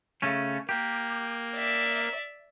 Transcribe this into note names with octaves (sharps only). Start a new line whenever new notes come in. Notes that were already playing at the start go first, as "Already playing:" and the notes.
C#3 A3 C#4
A#3 G4
D5 E5